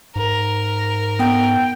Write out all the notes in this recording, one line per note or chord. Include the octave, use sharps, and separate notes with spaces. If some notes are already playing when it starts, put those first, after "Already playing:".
G#2 A#4
B3 G5